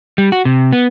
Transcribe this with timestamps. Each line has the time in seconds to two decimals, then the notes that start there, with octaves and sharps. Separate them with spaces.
0.18 G3
0.32 F#4
0.45 C3
0.73 B3